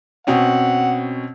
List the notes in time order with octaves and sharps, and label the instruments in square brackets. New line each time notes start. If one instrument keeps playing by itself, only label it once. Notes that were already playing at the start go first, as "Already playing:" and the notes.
[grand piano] B2 C4 C#4 [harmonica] F#5